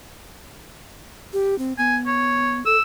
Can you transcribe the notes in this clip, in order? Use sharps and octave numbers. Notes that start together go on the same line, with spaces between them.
G4
C4
B3 G#5
C#5
A4 E6